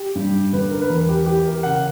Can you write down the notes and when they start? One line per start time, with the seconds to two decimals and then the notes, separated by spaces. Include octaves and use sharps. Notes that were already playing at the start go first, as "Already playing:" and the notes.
Already playing: G4
0.15 G2
0.53 D3 B4
0.71 A#4
0.82 B4
0.89 E2 A#4
1.09 G4
1.26 E3 G4
1.46 A#4
1.63 C#3 F#5